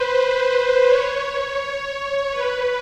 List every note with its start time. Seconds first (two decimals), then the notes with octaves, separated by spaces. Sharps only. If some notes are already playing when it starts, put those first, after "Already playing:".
Already playing: B4 C5
0.14 C5
0.86 C#5
2.31 B4